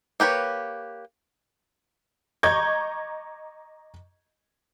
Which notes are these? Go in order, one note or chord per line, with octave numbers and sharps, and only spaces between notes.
A#3 G4 B4 C#5
D#5 A#5 C#6 D6 G6 G#6